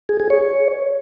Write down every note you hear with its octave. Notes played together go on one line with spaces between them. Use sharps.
G#4
G#4
C#5